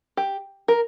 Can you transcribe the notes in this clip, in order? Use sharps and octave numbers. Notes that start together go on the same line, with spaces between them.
G4
A#4